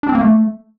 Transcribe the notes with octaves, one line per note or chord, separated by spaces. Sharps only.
D4
C4
A#3
A3